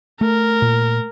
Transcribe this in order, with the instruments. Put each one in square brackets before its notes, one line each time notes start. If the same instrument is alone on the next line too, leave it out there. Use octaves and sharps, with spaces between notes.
[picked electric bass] A3 [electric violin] A#4
[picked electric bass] A#2